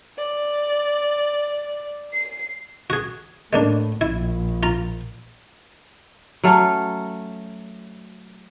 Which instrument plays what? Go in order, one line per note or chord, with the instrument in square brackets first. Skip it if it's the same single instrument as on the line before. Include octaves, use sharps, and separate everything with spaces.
[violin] D5
C7
[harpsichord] F#4 G#4
[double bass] A2 [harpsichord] G#3 A#3 D4
[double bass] A#1 [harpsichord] E4
[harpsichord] F4 A#5
[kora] F#3 A3 C#4 A4